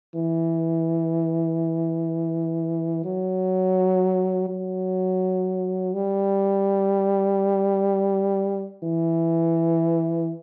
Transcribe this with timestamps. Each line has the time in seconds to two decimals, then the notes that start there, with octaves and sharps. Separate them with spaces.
0.15 E3
3.04 F#3
4.49 F#3
5.93 G3
8.83 E3